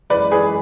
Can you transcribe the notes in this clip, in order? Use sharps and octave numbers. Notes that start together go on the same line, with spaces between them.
F#2 E3 G#3 B4 D5
G#4 B4